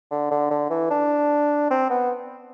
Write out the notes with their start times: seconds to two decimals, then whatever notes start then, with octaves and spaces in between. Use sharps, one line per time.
0.11 D3
0.31 D3
0.50 D3
0.70 E3
0.91 D4
1.71 C4
1.90 B3